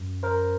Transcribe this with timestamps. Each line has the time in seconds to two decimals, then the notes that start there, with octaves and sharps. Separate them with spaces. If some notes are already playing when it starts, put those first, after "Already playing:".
Already playing: F#2
0.23 A#4 C5